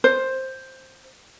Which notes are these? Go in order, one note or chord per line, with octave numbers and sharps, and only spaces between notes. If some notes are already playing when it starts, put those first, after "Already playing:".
C5